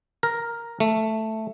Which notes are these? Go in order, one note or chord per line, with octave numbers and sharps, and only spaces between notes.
A#4
A3